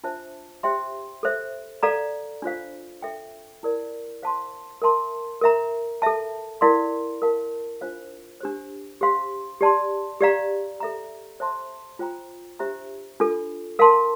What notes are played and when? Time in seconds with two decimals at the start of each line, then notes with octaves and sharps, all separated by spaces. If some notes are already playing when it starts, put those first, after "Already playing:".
0.04 D4 F4 C5 E5 A5
0.63 G4 C5 E5 G5 C6
1.23 A4 C5 E5
1.83 A4 D5 F5 A#5
2.42 D4 F4 C5 F5
3.02 A4 E5 G5
3.63 E4 A#4 D5
4.23 C5 F5 A5 C6
4.82 A#4 E5 A5 C6
5.41 A#4 E5 A#5
6.02 A4 E5 A5
6.61 E4 A#4 D5 F5 C6
7.22 A#4 F5 A5
7.81 D4 F4 C5 F5
8.40 D4 G4 C5
9.01 G4 C5 F5 C6
9.61 G4 D5 A5 C6
10.20 G4 D5 F5 A#5
10.80 A4 E5 A#5
11.40 C5 E5 A5 C6
11.99 F4 C5 G5 A#5
12.59 D4 G4 C5 E5 A#5
13.20 D4 F4 A4
13.79 A#4 F5 A5 C6